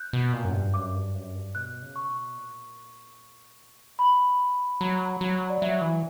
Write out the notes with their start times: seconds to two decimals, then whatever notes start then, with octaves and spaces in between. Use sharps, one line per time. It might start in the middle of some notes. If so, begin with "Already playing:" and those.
Already playing: F#6 G6
0.13 B2
0.33 A#2
0.45 F#2
0.53 G2
0.74 F#2 D6
0.95 G2
1.15 F#2
1.34 G2
1.55 B2 F#6
1.82 C#3
1.96 C#6
2.09 B2
2.36 A#2
3.99 C#3 B5
4.26 D3
4.53 F#3
4.81 F#3 A#5
5.21 F#3
5.49 D5
5.61 F#3 E5
5.81 E3